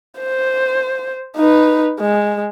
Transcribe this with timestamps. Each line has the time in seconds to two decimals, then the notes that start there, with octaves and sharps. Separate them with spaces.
0.20 C5
1.37 D#4 B4
2.00 G#3